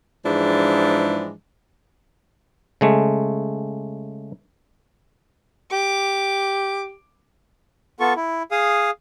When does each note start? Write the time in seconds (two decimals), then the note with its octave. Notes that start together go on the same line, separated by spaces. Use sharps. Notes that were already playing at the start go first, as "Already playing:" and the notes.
0.25 G#2 E3 F3 G#3 D4
2.81 C#3 G#3 A3
5.72 G4 D6
8.00 B3 F4 A4 C#6
8.16 E4
8.51 G#4 F5 D#6